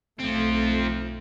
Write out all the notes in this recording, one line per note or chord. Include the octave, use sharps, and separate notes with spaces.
B1 F3 A3 C4